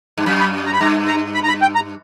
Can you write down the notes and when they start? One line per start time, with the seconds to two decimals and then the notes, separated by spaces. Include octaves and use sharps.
0.18 G2
0.26 F#2 B5
0.40 B5
0.67 A#5
0.73 B5
0.80 G2 A#5
1.07 A#5
1.35 B5
1.44 A#5
1.49 B5
1.62 G5
1.75 A#5